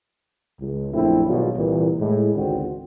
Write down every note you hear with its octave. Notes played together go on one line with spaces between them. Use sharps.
C#2
A#1 F#2 A3 C4 E4
G#1 B2 F#3 G3 F4
C2 A#2 E3
A2 G#3
G#1 C#2 D3 C4 F#4